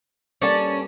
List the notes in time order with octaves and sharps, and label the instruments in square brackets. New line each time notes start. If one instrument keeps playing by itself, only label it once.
[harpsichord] G2 A#3 D4 [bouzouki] C#4 [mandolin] A4 D5 A5